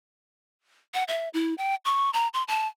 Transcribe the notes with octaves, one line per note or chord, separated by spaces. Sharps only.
F#5
E5
E4
G5
C#6
A#5
C6
A5